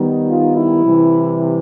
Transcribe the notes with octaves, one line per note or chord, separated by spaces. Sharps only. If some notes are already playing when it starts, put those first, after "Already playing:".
Already playing: D#3 G3 B3 D#4
F4
E4
C3 E3 G3